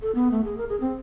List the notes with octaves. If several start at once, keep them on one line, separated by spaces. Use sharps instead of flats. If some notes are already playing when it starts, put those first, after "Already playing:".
A4
B3
A3
G#4
A#4
G#4
C4